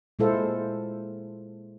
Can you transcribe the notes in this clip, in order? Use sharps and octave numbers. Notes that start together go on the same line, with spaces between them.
A#2 G#3 E4 A4 C5 F5